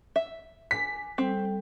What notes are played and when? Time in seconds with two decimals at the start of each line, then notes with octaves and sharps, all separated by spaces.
0.16 E5
0.71 G#5 D6 B6
1.18 G3 C4 A4 G5